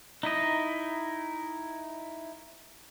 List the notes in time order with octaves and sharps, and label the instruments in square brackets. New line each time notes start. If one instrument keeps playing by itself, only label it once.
[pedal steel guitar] D#4 E4 D#5